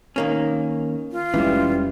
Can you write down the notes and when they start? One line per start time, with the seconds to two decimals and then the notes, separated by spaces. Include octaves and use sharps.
0.16 D#3 A#3 C#4
1.12 F4
1.34 F1 E3 G3 G#3 C#4